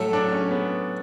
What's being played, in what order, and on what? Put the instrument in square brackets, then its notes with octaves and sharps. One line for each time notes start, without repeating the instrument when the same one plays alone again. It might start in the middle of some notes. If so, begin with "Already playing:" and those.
Already playing: [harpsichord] A2 F#3 A3 [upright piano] A4
[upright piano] D4
C#4
B3